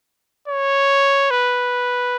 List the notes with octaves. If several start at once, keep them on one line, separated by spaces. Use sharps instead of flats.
C#5
B4